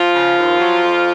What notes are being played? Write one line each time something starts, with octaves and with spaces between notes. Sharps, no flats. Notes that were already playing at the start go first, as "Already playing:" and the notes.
Already playing: F3 F4
C#3
D#2
F#3
F2